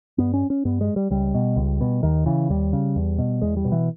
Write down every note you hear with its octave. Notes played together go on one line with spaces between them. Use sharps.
G2 B3
C#4
C#4
G2 B3
G#3
G3
C#2 G3
B2
C#2
B2
D#2 D#3
C#3 E3
D#2 G3
C#3
E2
B2
E2 G#3
G3
B2
E3